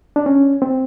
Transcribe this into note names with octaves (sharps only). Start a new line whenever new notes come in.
D4
C#4
C4